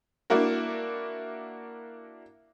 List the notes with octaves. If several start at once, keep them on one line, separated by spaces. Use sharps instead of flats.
A#3 D4 E4 F#4 A#4